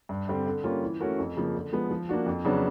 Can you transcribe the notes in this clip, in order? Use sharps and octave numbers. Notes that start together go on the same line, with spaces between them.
G2
D3 G3 C4
D3
G3 A#3 C#4 F4
E3
A3 C#4 F#4 A#4
F2
C#3 F3 A#3
D3
F3 G#3 B3
F3
A#3 D4 F#4
F2
C#3 F#3 B3 D4